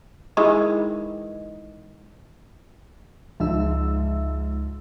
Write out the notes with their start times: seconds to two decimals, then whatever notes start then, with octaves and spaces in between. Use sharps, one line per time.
0.37 D#3 E3 G#3
3.40 C#2 G#2 F3 E5 E6